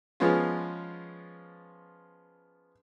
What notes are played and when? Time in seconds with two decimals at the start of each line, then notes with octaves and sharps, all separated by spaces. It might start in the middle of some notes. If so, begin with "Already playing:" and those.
0.20 F3 G#3 B3 C#4 F4